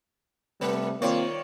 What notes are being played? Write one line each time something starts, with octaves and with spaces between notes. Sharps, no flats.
C3 G3 A3 A#3
D#3 A#3 C4 F4 C#5 D5